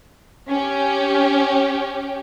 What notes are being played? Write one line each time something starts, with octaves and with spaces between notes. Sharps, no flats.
C#4 G4